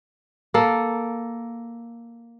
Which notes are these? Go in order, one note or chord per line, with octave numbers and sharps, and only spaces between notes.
A#3 A4